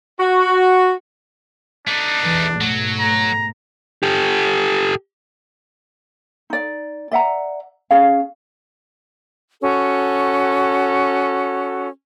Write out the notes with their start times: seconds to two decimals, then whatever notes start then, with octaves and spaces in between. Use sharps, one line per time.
0.20 F#4
1.87 A3 D4 D#4
2.24 B1 E2 E3
2.61 G#2 B2 F#3 A3
2.99 A#5
4.03 G4 A4
6.50 D#4 D5
7.11 D5 E5 F#5 A#5
7.91 C#4 G#4 F5
9.61 C#4 F#4 A4